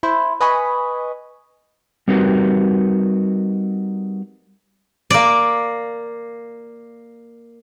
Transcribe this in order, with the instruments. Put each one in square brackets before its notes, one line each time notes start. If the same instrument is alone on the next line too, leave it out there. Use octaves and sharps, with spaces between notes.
[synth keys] E4 C5
B4 D#5 G#5 B5 C#6
[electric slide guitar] G3 C4 D#4 F#4 A#4 B4
[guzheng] A#3 D5